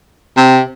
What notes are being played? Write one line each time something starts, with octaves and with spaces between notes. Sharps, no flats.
C3